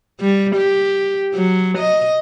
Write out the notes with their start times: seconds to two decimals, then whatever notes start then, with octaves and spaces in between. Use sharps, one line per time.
0.20 G3
0.56 G4
1.35 F#3
1.78 D#5